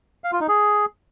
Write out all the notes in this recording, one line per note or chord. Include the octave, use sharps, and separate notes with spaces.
F5
F4
D#4
G#4